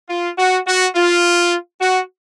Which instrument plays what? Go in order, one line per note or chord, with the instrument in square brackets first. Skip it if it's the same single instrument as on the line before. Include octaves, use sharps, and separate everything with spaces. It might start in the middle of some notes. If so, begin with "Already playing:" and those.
[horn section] F4
F#4
F#4
F4
F#4